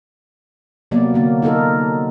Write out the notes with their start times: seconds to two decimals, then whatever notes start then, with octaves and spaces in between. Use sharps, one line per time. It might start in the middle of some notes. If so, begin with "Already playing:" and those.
0.91 C3 F#3 A#3 B3 D5
1.14 D3 A#3
1.42 D#4 F4 A4 A#4